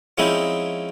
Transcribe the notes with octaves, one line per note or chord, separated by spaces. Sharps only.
F3 G#3 C4 C#4 D#4 E4